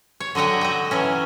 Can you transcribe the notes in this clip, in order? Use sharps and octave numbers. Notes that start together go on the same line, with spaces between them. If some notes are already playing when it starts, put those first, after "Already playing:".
C#5
D3 F#3 D#5 F#5 G5
F#4 D#5 G5
E3 F#3 C#4